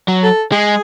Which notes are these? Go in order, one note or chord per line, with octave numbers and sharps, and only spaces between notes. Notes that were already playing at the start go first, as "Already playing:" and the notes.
F#3
A4
G#3 G#4